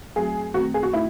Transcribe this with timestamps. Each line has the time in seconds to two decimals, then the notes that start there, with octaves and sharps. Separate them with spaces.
0.16 F#3 A3 C4 F#4 G#4
0.54 D#3 A3 C4 F#4
0.74 G#4
0.83 F#4
0.93 A3 D#4 E4 F#4